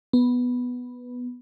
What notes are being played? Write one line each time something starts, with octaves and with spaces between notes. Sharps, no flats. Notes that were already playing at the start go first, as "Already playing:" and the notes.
B3